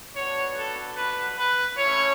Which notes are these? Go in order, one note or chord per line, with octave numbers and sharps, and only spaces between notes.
B3 D4 F#4 C#5
A4
B4
B4
A3 C#4 E4 C#5